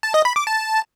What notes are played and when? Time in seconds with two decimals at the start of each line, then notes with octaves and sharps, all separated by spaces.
0.03 A5
0.14 D#5
0.25 B5
0.36 D6
0.47 A5